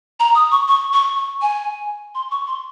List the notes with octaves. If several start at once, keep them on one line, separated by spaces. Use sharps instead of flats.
A#5
D#6
C#6
C#6
C#6
C#6
G#5
C6
C#6
C6